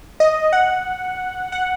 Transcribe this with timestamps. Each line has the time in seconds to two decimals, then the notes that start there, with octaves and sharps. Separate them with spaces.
0.20 D#5
0.53 F#5
1.52 F#5